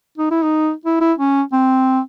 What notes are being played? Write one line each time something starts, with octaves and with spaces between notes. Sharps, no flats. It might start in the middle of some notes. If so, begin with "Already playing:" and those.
D#4
E4
D#4
E4
E4
C#4
C4